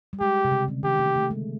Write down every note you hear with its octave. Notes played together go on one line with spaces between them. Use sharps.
G3
G#3 G4
C3
C#3
D3
D#3 G4
A3
A3
G#3